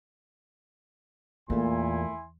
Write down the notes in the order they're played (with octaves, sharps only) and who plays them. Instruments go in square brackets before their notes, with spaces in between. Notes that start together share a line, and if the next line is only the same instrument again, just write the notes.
[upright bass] E2 [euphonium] A#2 [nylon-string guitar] A3 A#3 A4 [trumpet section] E4 G#5 C6